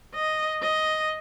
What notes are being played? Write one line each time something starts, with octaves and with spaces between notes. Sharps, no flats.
D#5
D#5